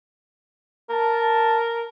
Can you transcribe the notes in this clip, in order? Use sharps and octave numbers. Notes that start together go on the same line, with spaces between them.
A#4 A5